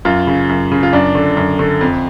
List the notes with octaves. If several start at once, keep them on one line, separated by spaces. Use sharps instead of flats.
F#2 F4
C#3
F#2
C#3
F4
F#2 D4
D3
F#2
D3
F2